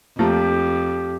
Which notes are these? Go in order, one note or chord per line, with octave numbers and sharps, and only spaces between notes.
F2 F3 A3 A#3 G4